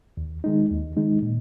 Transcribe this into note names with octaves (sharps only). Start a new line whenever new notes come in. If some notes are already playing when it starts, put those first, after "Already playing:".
D#2
D#3 G#3 D#4
D#2
D#3 G#3 D#4
A#2